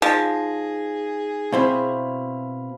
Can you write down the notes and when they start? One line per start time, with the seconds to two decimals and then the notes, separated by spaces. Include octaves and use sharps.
0.02 F3 D#4 G#4 A#6
1.52 B2 C4 E4 F5 B5